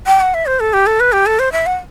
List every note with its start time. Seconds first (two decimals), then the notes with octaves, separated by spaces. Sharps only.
0.06 G5
0.21 F#5
0.34 E5
0.46 C5
0.60 A4
0.73 G4
0.86 A4
1.00 B4
1.12 G4
1.26 A4
1.39 C5
1.52 E5
1.66 F#5